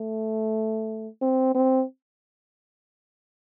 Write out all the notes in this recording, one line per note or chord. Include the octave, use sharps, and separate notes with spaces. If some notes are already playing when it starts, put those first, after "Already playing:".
Already playing: A3
C4
C4